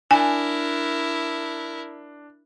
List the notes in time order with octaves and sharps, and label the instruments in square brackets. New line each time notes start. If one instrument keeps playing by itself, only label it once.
[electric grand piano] D4 [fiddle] E4 A#4 [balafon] G#5